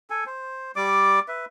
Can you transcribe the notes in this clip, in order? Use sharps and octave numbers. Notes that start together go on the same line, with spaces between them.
A4 G#5
C5
G3 D5 D6
B4 E5